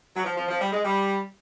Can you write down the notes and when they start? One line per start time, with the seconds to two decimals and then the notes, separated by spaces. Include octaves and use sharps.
0.16 F#3
0.25 F3
0.37 F3
0.48 F3
0.60 G3
0.72 G#3
0.84 G3